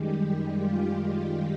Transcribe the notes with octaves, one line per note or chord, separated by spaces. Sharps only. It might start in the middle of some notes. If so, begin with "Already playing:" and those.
Already playing: F#2 D#3 G3 G#3 G4
G3 G4
F4